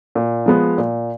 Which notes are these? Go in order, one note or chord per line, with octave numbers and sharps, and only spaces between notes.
A#2
F3 G#3 B3
A#2